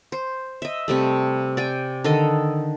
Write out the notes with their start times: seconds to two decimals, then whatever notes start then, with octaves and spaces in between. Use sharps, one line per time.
0.12 C5
0.62 D#5 E5
0.88 C3 G3 A3
1.57 D5 G5 G#5
2.04 D3 D#3 A4 D#5